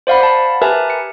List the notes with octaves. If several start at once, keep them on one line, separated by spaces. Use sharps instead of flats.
C5 D5 F5 F#5 B5
A5 B5
G4 A#4 B4 E5 G#5 A5
C#7